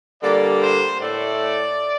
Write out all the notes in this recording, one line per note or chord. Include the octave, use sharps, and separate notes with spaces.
D3 G3 A#3 D5
C5
A2 A3 D5